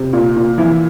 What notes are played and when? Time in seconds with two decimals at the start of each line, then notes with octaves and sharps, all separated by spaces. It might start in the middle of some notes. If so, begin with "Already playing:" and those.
Already playing: C3
0.13 A#2
0.37 A#2
0.58 E3 E4